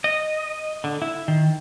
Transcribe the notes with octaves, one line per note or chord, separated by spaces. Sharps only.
D#5
D3
E4
D#3